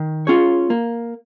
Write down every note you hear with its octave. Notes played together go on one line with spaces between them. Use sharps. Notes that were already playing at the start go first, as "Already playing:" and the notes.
Already playing: D#3
C#4 F4 G#4 C#5
A#3